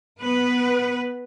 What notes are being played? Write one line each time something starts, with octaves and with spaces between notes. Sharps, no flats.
B3 B4